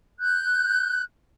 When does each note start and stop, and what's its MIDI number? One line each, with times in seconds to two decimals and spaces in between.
0.19 1.02 90
0.19 1.02 91